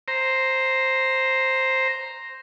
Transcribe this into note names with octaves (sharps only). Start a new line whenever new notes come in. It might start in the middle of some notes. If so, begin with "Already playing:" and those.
C5 A#5